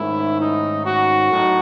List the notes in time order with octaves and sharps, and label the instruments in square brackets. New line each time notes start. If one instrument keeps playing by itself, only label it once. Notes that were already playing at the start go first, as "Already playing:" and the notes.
Already playing: [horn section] G#2 D#3 A3 C#4 E4
D#4
F#4
A2 F#3 D#4